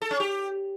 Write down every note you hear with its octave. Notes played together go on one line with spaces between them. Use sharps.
A4
C#4
G4